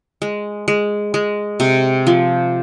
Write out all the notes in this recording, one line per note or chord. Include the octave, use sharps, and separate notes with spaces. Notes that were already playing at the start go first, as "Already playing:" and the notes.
G#3
G#3
G#3
C3
F3